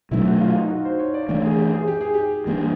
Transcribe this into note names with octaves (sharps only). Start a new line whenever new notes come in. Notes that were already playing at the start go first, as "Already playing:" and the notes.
B2 F#3 A3 D4 E4
F#4
F4
D#4
F#4
C5
C#5
D5
E3 A3 D4 C#5
G#4
G4
G#4
G4
G#4
G4
E3 G3 A#3 D4